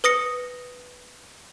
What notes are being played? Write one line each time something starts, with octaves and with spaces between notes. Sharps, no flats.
B4 D#6 A#6 C#7